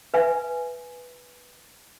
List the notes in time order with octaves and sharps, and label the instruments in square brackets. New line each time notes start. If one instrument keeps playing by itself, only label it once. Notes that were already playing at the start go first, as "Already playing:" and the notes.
[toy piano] B4 E5 G#5